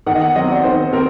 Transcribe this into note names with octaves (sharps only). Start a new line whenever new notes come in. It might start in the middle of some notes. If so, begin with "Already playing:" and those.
D#3 F#5
D#5
F#5
F#3 C4 D#5
D5
D#3 C5
C4 A#4